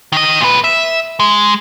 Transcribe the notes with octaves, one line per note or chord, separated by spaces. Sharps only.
D#3 D#5
A#2 B4
E5
G#3